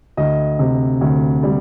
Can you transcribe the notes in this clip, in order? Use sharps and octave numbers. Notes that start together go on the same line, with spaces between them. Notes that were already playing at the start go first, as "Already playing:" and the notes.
D2 D#5
C3
D2
G3